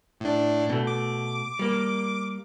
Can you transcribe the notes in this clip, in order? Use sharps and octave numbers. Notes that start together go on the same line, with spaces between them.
A2 D4
B2 A3
D6
G3 A#3